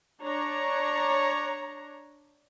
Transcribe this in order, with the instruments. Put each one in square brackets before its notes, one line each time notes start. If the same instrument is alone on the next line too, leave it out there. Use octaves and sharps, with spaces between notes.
[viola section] D4 C#5 A#5